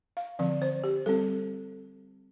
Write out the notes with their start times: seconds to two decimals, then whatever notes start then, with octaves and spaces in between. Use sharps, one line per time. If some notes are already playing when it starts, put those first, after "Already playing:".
0.17 F5
0.39 D3 F3 C4 D5
0.62 C5
0.84 G4
1.06 G3 C4 A4